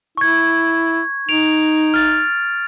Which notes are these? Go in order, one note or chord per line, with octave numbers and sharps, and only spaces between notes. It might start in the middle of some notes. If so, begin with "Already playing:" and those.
E4 C#6 G#6
D#4 D7 F7
F6 A6